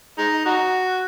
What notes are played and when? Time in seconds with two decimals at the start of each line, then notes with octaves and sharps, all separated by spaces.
0.18 G#3 D#4
0.45 D#4 F#4